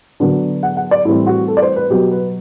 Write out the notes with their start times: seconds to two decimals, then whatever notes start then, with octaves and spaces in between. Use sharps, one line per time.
0.20 D3 F#3 B3 D4
0.63 F#5
0.77 F#5
0.91 D5
1.05 A2 E3 G3 C4 E4
1.27 F#4
1.48 A4
1.57 D5
1.62 C5
1.76 B4
1.90 B2 F#3 B3 G4
2.11 B4